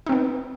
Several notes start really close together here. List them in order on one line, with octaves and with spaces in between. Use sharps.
D#4 C4 B3